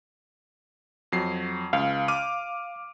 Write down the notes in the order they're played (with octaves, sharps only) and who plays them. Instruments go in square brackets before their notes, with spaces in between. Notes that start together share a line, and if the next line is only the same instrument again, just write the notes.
[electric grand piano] F2 F#3 C7
[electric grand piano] C#2 [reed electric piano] F5
[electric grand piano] D6 F6 D#7